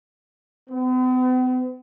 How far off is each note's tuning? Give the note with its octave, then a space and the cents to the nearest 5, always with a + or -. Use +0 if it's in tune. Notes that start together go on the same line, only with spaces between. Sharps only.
B3 +45